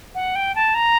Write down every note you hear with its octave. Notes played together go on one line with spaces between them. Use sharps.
F#5
G5
A5
A#5